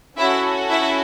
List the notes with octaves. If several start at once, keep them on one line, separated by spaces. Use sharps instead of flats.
C#4 E4 F#4 A4 E5
E4 E5